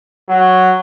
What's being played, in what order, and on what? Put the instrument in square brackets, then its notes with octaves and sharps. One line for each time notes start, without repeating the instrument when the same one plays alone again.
[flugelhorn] F#3